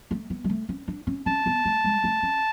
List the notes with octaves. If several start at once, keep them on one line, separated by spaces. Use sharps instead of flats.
A3
B3
G#3
A3
C#4
D4
C#4
C#4 A5
B3
A3
G#3
A3
C#4